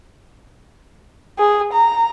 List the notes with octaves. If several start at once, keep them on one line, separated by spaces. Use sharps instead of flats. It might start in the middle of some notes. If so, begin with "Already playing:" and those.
G#4
A#5